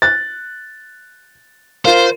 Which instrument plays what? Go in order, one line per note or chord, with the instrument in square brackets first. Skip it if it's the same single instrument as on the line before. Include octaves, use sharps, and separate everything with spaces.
[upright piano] F#6 A6
[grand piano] F4 A#4 F5 [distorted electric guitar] C5